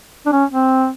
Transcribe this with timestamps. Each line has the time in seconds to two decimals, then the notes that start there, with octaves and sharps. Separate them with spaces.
0.26 D4
0.32 C#4
0.51 C4